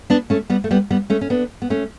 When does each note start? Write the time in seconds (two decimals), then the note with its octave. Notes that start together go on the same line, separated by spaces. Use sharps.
0.10 B3 D4
0.30 A3 C#4
0.50 G3 B3
0.64 A3
0.71 G3 B3
0.91 G3 B3
1.10 A3 C#4
1.21 C#4
1.30 B3 D4
1.62 B3
1.70 A3 C#4